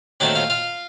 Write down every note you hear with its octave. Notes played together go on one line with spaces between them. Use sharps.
D#2 D#3 F#3 A3 C4 D4 D5
F4 F5
F4 F5